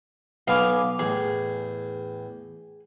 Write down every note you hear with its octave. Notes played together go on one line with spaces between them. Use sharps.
B1 B3 F5 G#5 D6
E2 A2 G#4